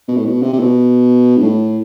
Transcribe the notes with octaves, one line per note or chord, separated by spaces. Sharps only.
B2
A2
B2
C3
C3
B2
G2
A2